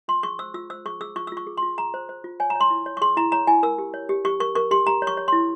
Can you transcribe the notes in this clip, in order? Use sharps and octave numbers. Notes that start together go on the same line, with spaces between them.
F4 C6
G#4 C#6
C5 E6
F4 E6
C5 E6
G#4 C#6
G#4 E6
F4 C#6
E6
F4 C#6
G#4
C6
F4
G#4 A#5
C5
C5
F4
C#5 G#5
A#5
C#5
C6
E4
C#5
C#6
G#4 C6
E4 A#5
C#5 A#5
E4 G#5
A#4 E6
G4
C#5
G4
G4 C#6
A#4 C#6
A#4 C#6
G4 C6
G4 A#5
C#5
C#6
C#5
C6
E4